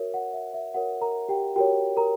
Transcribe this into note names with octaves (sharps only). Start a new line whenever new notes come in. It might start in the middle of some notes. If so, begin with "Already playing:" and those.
Already playing: F#4 A#4 C#5 E5
F#5
E5
E5
F#4 A#4 C#5 F#5
A#4 A#5
G4 G5
F#4 G4 A#4 C#5 G5
A#4 A#5